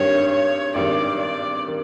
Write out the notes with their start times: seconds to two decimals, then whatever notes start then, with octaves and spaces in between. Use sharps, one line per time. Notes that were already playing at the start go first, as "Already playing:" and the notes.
Already playing: G#1 G2 D#3 C#5
0.31 C#5
0.75 G#1 G2 D#3 D5
1.20 D5
1.67 D#3